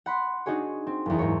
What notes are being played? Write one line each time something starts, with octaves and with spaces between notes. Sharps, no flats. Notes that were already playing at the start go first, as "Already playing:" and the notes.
F#5 B5 C6
D4 D#4 F#4 G#4 C#5
C4
F#1 E2
G#2 A#4 C#5